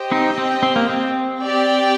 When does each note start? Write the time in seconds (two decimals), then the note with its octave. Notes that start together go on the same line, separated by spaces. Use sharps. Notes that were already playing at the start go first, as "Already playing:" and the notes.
Already playing: G4 C5 D#5 G5
0.12 C4 D#4
0.38 C4
0.63 C4
0.76 A#3
0.89 C4
1.40 G4 D5 G5